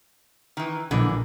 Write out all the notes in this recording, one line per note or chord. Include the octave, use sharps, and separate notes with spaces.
D#3 E3
A#1 G#2 D3 E3